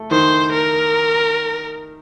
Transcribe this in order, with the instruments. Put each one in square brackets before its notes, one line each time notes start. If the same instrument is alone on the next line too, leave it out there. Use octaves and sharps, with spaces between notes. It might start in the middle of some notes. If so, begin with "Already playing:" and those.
Already playing: [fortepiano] A3
[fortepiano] D#3 [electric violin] C5
[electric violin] A#4